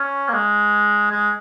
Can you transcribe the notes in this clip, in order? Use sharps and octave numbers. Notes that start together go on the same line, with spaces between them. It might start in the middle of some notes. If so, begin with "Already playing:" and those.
Already playing: C#4
A#3
G#3
G#3